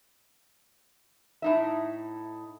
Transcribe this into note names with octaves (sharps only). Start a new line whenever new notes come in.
A2 D#4 E5